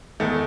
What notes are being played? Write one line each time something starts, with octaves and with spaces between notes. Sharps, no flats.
E2 D#3 A3